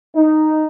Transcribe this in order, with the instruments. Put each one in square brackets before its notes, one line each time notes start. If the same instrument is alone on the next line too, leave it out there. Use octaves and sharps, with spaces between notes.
[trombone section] D#4